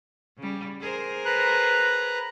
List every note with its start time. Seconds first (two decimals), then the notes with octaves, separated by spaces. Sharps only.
0.38 C#3 G3
0.81 G#4 A#4 C5
1.25 B4 A#5 F#6